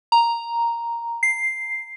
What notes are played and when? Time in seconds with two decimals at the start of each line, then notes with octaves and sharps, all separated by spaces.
0.12 A#5
1.23 C7